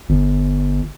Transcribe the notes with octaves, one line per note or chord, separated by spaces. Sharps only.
G1